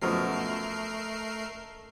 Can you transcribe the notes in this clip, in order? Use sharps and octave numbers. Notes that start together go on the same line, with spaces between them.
F#2 B2 F3 A3 A#4 C7